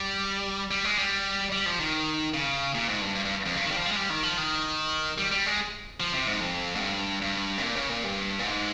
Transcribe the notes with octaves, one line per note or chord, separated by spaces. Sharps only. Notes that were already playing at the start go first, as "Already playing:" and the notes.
Already playing: G3
G3
G#3
G3
G3
F3
D#3
C#3
A#2
G#2
G2
G2
G2
F2
G2
D#3
G3
F3
G3
G#3
G3
D#3
F3
D#3
G3
G3
G#3
F3
C3
G#2
F2
G#2
G2
G2
C3
A#2
C#3
A#2
G2
A#2
G#2